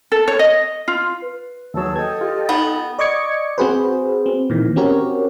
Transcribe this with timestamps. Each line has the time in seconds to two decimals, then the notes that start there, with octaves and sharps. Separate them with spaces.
0.12 A4
0.28 C#5
0.39 D#5
0.88 F4
1.22 B4
1.74 D#2 F#3 G#4 A5 E6
1.96 A4 D#5 G5 G#6
2.21 F4 G4
2.49 B3 D#4
2.99 D5 D#5 C#6 D6 G#6 C#7
3.58 C4 F#4 G#4 B4 C5
4.26 C4
4.50 A#2 D#3 E3
4.76 C4 C#4 F#4 G4 A#4 C#5